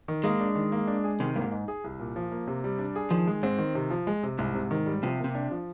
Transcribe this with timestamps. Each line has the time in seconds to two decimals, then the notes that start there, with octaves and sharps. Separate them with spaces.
0.08 D#3
0.24 G#3 A#3
0.40 D4
0.55 D#3
0.72 A#3
0.87 D4
1.04 G#4
1.20 C3 D#3
1.36 G2 A#3
1.42 G#2
1.52 D#4
1.68 G#4
1.84 C2
1.99 A#2
2.16 F3
2.32 A#3
2.47 C3
2.64 G3
2.79 D4
2.96 G#4
3.11 D#3 F3
3.27 G#3
3.43 G#2 C4
3.58 D#3
3.75 C3
3.90 F3
4.07 G#3
4.23 C3
4.38 C2 G#2
4.54 C3
4.71 D#3
4.86 G3
5.03 C3 F3
5.19 A#3
5.24 C3
5.35 D4
5.51 F3